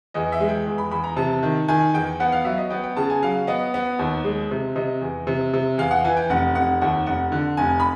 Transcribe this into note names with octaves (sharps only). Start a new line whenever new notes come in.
E2 D#5
E5
G#3
G5
E2
B5
E2 B5
A#5
C3 A5
D#3
D#3 G#5
E2 G5
B3 F#5
F5
F#3 E5
D#5
B3 G5
G5
C#3 A5
G#5
F#3 F5
B3 D#5
B3
D#2
G#3
C3
C3 D#5
E2
C3
C3
E2 F5
F#5
E3 G#5
G5
F1 F#5
F1 F#5
D#2 F#5
F1 F#5
D3
F1 G#5
B5